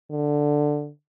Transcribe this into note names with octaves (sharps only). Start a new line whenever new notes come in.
D3